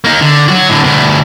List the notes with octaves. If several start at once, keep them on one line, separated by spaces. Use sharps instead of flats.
A#3 D#4
D3
F#3 F#4
A2 D3
D2 B2